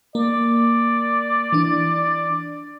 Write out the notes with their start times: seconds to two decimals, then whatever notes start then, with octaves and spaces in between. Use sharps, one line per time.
0.15 A#3 D5
1.52 E3 D4